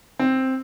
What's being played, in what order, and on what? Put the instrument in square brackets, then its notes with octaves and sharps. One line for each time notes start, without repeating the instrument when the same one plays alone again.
[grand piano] C4